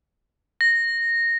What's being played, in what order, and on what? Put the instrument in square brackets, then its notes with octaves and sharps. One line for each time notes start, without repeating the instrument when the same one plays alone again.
[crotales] A#6